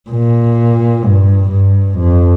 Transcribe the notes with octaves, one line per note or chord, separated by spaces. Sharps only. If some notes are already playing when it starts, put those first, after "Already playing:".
A#2
G2
G2
F2